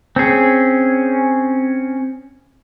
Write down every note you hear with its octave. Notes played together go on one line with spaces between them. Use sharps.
C4 C#4 G#4